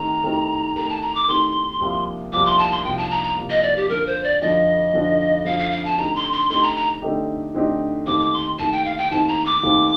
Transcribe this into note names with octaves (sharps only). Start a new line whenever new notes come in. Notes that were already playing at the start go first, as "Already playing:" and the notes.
Already playing: D#3 A3 C4 G4 A#5
D#3 A3 C4 G4 A#4
D#3 A3 C4 G4 A#4 A#5
A5
A#5
D6
D#3 A3 C4 G4 A#4 C6
C2 C3 F3 A#3
C2 C3 F3 A#3 D6
C6
A5
C6
C2 C3 F3 A#3 G5
A5
A#5
A#5
C2 C3 F3 A#3
D#5
D5
G4
F2 D3 F3 A#4
C5
D5
F2 D3 F3 D#5
F2 D3 F3
F2 D3 F3 F5
F5
F5
A5
D3 A3 C4 D#4 G4 A#5
C6
C6
D3 A3 C4 D#4 G4 C6
A#5
A#5
D3 A3 C4 D#4 G4
D3 A3 C4 D#4 G4
D#2 D#3 A3 C4 D6
D6
C6
D#2 D#3 A3 C4 A5
G5
F5
G5
D#2 D#3 A3 C4 A5
A#5
D6
D#2 D#3 A3 C4